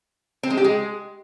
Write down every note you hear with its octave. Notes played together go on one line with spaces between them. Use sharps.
C4
G#3
G4
G#3